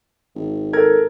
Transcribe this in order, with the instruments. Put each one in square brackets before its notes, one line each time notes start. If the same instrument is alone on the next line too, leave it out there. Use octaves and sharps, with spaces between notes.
[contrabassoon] G#1
[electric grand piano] A4 A#4 G#6